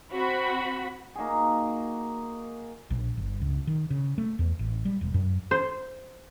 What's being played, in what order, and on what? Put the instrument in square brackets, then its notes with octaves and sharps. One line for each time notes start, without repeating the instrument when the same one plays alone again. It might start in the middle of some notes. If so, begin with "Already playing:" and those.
[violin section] C4 F#4 B5
[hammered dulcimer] A#3 D#4 F#4 G#4
[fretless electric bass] A#1
G1
C#2
D#3
C#3
A3
E2
A1
G3
E1
F#2
[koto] C5